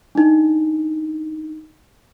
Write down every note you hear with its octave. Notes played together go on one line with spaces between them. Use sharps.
D4 D#4